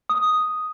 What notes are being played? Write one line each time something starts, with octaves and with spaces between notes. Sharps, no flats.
D#6